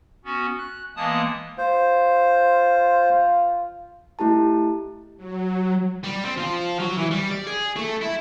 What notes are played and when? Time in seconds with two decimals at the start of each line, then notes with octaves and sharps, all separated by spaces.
0.25 B3 C#4 F#4
0.59 F#6
0.96 E3 G#3 A#3 B3 A5 D#6
1.58 F4 C5
4.19 A3 E4 G4 A5
5.17 F#3
6.04 G3
6.26 C4
6.38 F3
6.79 F#3
6.98 E3
7.11 G3
7.31 D5
7.47 G#4
7.77 A3
8.02 E4